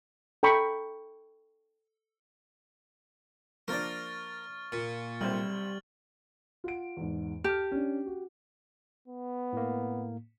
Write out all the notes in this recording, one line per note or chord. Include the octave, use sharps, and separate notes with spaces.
A4 G5 A#5 B5 C#6
F3 A#3 D4 A#4 D5 C#6 F6 A6
A#2 A6
B1 C3 G3 C5 F6 F#7
F4 F#5 D7
E2 G#2
G4 A5 F6
C#4 D4
F#4
B3
A2 A#3